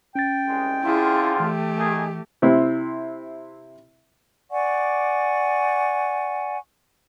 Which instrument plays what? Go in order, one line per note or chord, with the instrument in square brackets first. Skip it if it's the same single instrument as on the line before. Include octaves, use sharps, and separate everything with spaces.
[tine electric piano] C#4 A6 [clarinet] G5
[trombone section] C2 G#3
[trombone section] D3 C4 F4 [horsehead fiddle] E4 G#4
[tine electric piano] E3 [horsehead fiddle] A3 G4
[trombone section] D#3 G#4
[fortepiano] C3 C4 E4
[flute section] D5 F#5 G#5 C#6